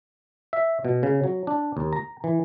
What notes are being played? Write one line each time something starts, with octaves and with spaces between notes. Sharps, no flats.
E5
B2
C#3
F#3
D4
D#2
A#5
E3